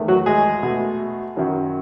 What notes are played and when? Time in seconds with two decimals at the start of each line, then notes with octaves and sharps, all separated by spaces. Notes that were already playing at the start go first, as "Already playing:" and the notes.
Already playing: E2 D#3 A3
0.08 F#3 F#4
0.26 G#3 G#4
0.63 B2 A3
1.37 F#2 D#3 F#3